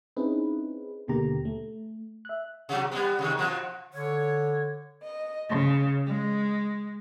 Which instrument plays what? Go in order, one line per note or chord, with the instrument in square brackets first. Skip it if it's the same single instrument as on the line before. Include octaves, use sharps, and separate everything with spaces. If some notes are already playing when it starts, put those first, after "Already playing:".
[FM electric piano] C4 C#4 D#4 E4 G#4 B4
D#2 B2 D3 A#3 G4 A#5
A3
E5 F#6
[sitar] C3 F#3
G3 B3
C3 D#3
B2 F3
[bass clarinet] D3 [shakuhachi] C#5
[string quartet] D#5
C#3
G#3